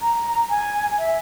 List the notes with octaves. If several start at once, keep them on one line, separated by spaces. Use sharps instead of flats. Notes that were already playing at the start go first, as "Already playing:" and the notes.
A#5
G#5
E5